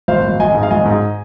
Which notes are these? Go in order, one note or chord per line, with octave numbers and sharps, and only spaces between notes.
G#1 C5 F5
G#1
G#1 D#5 G#5
G#2
F5
G#1 D#5 G#5
G#2